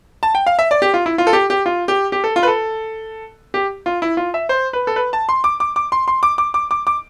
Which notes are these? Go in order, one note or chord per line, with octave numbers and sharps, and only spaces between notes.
A5
G5
F5
E5
D5
G4
F4
E4
F4
A4
G4
G4
F4
G4
G4
A4
F4
B4
A4
G4
F4
E4
F4
E5
C5
B4
A4
B4
A5
C6
D6
D6
D6
C6
C6
D6
D6
D6
D6
D6